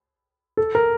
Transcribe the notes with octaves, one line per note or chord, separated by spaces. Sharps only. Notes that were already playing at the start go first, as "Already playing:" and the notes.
A4
A#4